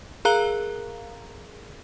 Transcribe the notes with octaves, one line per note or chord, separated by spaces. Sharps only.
G#4 A#4 F5 A#5 F#6 G7